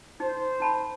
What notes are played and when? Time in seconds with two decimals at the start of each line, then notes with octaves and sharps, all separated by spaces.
0.20 D#4 C5
0.60 D#4 A5 B5